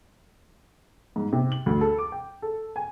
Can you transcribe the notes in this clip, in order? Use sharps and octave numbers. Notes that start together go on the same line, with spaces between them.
G#2
C3
F#7
D2
A4
D6
G5
A4
G#5